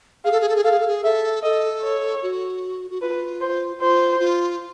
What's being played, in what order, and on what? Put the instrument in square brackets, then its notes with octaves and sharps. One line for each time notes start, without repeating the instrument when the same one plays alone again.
[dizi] G#4 [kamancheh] F5
[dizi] A4
G#4
A4
G#4
[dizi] A4 [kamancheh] F5
[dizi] G#4
A4
G#4
[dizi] A4 [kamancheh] E5
[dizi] A4 [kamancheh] D#5
[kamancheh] C#5
[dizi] F#4
F#4
[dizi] F4 [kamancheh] B4
[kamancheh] C5
[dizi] F4 [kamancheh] C5
[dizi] F4